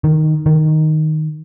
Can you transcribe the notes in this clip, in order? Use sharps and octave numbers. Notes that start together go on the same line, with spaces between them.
D#3
D#3